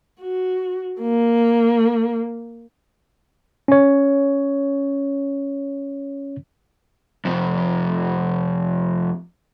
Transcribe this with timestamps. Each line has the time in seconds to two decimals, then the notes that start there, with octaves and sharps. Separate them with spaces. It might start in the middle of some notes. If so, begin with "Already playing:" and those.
0.21 F#4
1.01 A#3
3.68 C#4 C#5
7.25 F2 C3